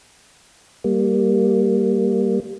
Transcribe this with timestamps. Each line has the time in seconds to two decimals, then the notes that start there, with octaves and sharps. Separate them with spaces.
0.84 G3 A#3